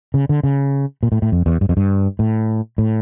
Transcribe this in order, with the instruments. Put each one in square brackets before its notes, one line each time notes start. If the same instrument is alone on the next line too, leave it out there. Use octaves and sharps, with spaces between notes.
[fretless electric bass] C#3
D3
C#3
A#2
A2
A2
F2
E2
G2
F2
G2
A2
A2